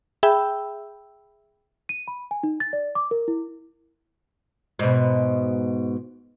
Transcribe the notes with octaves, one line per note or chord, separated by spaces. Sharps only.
G#4 E5 G5 B5 E6 G6
D#7
B5
G#5
D#4
A6
D5
D6
A#4
E4
G#2 B2